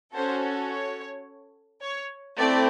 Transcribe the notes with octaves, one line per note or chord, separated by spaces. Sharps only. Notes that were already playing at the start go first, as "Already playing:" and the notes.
C#4 F#4 A4 C5
C#5
C#5
A3 C4 E4 D5